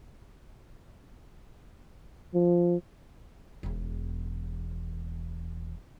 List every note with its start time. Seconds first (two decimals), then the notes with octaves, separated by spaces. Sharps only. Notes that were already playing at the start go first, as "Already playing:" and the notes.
2.34 F3
3.63 E1 E2